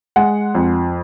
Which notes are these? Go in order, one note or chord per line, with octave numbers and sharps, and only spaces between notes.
G#3 F#5
F2